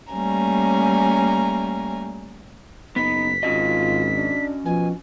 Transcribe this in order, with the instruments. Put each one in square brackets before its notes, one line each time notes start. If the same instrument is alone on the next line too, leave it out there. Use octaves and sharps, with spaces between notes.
[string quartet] G3 A3 A#3 C#4 G#5 A#5
[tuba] F#1 [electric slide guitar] B3 [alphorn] D#4 [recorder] B6
[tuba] G#1 [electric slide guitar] C#4 F#4 D#5 [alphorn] F4
[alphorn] D4
[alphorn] B2 [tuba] F3 [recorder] G#5